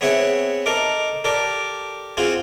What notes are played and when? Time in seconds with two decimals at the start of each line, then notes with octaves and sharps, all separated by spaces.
0.01 B3 C4 G#4 C#5 E5 F#5
0.66 D#4 A4 A#4 D6
1.24 G4 A4 A#4 D5 D6
2.17 C4 F4 F#4 G#4 C5